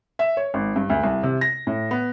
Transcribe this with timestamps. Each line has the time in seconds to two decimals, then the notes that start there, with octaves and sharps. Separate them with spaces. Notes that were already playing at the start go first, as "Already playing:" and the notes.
0.19 E5
0.37 C#5
0.54 G#1
0.76 G2
0.90 D2
1.04 C2
1.23 C3
1.41 A#6
1.67 A2
1.91 B3